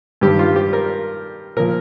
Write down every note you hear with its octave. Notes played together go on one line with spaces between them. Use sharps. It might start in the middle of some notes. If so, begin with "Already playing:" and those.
G2 D#3 G3 G4
F4
G4
A#4
A#2 F3 A#4